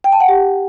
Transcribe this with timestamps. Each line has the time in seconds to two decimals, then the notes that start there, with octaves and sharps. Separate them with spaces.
0.04 G5
0.12 A5
0.20 F#5
0.28 G4